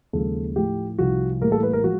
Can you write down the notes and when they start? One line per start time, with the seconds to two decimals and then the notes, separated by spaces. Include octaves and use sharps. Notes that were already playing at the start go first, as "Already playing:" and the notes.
0.13 D#2 C#3 F3 G#3 A4
0.56 A2 F3 A3 G4
0.98 C2 C3 F3 F#4
1.41 A2 E3 G3 A#3 A#4
1.52 A4
1.63 B4
1.73 A#4
1.84 F3 G#3 F#4